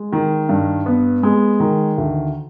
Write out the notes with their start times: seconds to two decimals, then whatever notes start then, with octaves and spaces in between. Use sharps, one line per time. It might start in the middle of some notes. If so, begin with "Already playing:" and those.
Already playing: G#3
0.13 D#3
0.49 G2
0.86 B3
1.23 G#3
1.60 D#3
1.98 D2